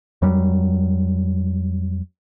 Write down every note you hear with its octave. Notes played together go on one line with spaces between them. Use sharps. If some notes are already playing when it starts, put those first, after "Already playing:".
F2 F#3 G3